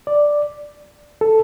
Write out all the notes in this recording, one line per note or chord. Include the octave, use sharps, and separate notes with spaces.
D5
A4